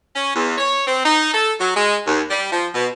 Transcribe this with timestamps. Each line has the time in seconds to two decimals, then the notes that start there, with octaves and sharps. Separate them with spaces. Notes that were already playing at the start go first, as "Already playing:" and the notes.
0.16 C#4
0.36 E2
0.58 C#5
0.87 C4
1.05 D#4
1.34 A4
1.61 F#3
1.76 G#3
2.07 D#2
2.30 G3
2.52 F3
2.75 B2